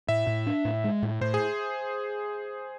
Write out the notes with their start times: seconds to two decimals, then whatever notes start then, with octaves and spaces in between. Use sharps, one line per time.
0.08 A2 E5
0.27 A2
0.47 D4
0.65 A2
0.84 G#3
1.03 A2
1.21 A2 C5
1.34 G#4